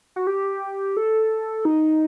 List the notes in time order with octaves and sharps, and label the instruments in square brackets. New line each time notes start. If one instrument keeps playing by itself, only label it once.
[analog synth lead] F#4
G4
A4
D#4